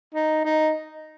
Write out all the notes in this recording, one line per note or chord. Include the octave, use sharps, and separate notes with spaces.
D#4
D#4